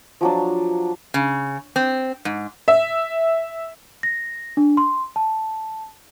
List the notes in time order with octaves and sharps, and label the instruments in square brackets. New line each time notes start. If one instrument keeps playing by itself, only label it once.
[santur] F3 F#3 D4
[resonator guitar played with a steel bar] C#3
C4
G#2
[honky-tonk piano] E5
[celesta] A#6
D4
C6
A5